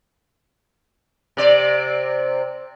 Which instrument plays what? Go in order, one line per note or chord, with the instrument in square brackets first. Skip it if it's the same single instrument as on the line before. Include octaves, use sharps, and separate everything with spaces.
[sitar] C3 D5